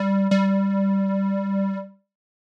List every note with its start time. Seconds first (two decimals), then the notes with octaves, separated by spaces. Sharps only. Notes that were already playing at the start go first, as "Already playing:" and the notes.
Already playing: G3
0.31 G3